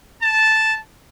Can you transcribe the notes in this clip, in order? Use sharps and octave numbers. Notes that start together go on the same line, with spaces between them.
A5